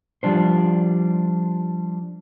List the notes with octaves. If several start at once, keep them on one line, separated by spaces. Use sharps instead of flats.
F3 G3 D4 C5